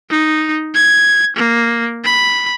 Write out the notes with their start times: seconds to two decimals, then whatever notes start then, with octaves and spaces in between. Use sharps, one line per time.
0.10 D#4
0.75 G#6
1.37 A#3
2.05 B5